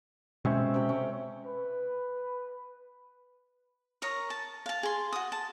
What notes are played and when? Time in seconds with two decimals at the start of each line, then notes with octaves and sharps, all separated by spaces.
0.45 B2 G#3 C4 C#4 E5 C#6
0.74 C3 G5
0.89 C#4
1.47 B4
4.02 A#4 C#5 A#5 D#6
4.30 A5
4.66 F5 A5
4.83 G#4 C6
5.13 F#4 D#6
5.32 A5